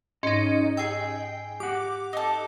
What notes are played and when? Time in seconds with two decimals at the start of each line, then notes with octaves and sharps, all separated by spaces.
0.23 G#2 C#4 D#4 D#5
0.77 G#4 G5 E6
1.60 G4 F#5 D6
2.13 D#4 A4